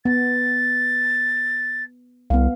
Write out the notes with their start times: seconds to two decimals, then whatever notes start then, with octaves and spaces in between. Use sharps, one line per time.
0.05 B3 A6
2.30 C2 B3 F5